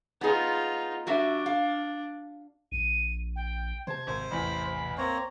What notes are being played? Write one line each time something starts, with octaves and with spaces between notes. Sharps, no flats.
B3 D#4 F4 G#4
G3 D4 F#4 E5
F5
A#1 D#7
G5
C3 C5 A5 G#6
G#1 C5
A1 E2 A2 B5
A#3 C4 C#5 A#5